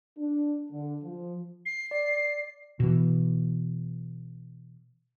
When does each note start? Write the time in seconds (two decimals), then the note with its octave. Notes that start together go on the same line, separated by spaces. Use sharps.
0.18 D4
0.70 D3
1.02 F3
1.66 C7
1.91 D5
2.80 B2 E3